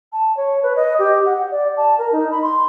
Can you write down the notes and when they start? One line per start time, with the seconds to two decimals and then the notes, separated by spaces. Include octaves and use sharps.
0.13 A5
0.37 C#5
0.63 B4
0.76 D#5
0.99 G4
1.26 F#5
1.51 D5
1.77 A5
1.99 A#4
2.12 D#4
2.31 B5
2.42 C6